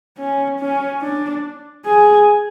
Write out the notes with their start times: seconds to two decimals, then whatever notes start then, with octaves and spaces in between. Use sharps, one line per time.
0.19 C#4
0.60 C#4
1.02 D4
1.85 G#4